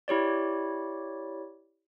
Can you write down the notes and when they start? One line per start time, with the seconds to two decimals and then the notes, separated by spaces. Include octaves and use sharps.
0.08 E4 G4 C#5 D5